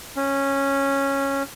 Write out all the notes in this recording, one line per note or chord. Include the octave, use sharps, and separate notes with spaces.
C#4